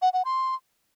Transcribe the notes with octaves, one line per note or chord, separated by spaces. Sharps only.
F#5
F#5
C6